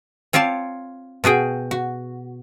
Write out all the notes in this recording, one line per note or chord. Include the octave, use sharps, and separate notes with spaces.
C4 F4 C#5 D5 A5
B2 F#4 G#4 G5
F#4